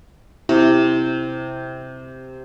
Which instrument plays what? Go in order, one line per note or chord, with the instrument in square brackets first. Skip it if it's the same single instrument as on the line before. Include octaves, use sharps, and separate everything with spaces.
[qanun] C3 [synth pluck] E4